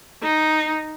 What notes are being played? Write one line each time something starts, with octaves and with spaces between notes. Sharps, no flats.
D#4